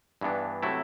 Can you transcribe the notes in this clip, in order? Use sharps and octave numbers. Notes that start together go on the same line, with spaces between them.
G2 E3 B3 D4
C3 F#3 A3 E4